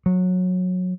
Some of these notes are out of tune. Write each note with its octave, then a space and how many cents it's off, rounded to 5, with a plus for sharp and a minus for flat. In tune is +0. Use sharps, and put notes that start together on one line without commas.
F#3 -20